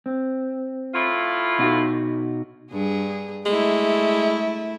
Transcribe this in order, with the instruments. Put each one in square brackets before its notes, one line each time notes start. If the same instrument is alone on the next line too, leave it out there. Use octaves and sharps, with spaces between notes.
[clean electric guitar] C4
[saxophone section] A2 E4 F4
[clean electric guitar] B2 D#4 F#4
[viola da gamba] G2 G#4
[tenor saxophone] G#3 [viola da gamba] A3 E4